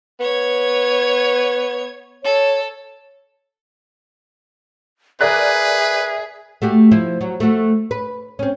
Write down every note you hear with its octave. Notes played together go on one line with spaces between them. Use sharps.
B3 C#5 G#6
A4 C#5
G#4 A#4 B4 D5 E5 F#6
A3 F#4 G4
F3 E4
F#3
A3 F#4
B4
C4 C#4